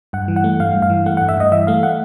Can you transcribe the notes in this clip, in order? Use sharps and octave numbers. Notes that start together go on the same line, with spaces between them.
G2 F#5
E3
F#5
A3
G2 F5
G2
F5
E3
A3 F#5
F#5
G2
E5
G2 D#5
E3 E5
A3 F5
F#5